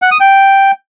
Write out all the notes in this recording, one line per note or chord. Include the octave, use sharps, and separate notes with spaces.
F#5
D#6
G5